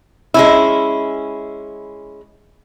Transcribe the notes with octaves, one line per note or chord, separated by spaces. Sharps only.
G#3 C#4 E4